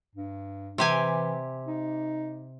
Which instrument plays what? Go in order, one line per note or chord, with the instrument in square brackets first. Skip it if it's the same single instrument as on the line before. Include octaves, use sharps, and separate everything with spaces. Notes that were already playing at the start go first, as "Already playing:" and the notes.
[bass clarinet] G2
[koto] C3 G4 G#5 [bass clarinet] E3
[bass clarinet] D#4